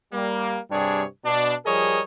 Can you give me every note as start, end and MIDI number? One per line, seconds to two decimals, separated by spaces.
0.13 0.58 55
0.13 0.58 58
0.71 1.04 43
0.71 1.04 48
0.71 1.04 55
0.71 1.04 62
0.71 1.04 68
0.71 1.04 73
1.24 1.54 47
1.24 1.54 62
1.65 2.00 53
1.65 2.00 55
1.65 2.00 68
1.65 2.00 70
1.65 2.00 73
1.65 2.00 75